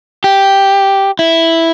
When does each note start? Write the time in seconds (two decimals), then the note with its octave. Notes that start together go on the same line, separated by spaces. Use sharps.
0.24 G4
1.19 E4